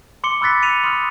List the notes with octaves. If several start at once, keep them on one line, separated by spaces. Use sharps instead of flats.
C6 D6 C#7 G7
B5 E6 F#6 A6 B6
C#7 D#7 F7
C6 D#6 F6